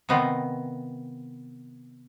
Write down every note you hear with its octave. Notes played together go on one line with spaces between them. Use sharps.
C3 D#3 B3 D#4 F4